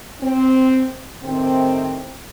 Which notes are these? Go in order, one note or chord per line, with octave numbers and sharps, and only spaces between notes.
C4
A2 C3 D#3 C4